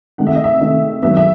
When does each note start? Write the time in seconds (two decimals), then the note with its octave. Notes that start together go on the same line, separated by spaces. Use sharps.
0.18 C3 D#3 A3 F#5
0.27 E5
0.35 D#5
0.44 E5
0.61 C3 D#3 A3
1.02 D#3 F#3 B3 E5
1.17 E5